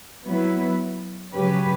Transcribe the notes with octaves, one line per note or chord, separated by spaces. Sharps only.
F#3 B3 E4 B4
C#3 F#3 C#4 G4 B4